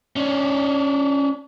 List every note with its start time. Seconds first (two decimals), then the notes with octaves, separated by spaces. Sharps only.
0.16 C#4 D4